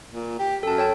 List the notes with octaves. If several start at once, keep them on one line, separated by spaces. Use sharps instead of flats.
A#2
G4
F#2 A4 A5
C#5 G5 A5